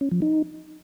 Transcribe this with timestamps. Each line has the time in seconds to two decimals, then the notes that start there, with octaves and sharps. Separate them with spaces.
0.01 C#4
0.11 F3
0.22 D#4